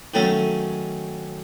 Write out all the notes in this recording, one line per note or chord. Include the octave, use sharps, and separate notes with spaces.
D#3 F#3 A3 C#4